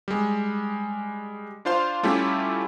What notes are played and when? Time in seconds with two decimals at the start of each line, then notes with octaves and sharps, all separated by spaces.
0.08 G3 G#3
1.65 D4 F4 C5 F5 C6
2.03 G3 A3 C#4 E4 F4 G4